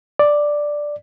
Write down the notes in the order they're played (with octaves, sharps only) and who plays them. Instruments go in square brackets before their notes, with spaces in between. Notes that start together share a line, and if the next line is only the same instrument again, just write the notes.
[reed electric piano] D5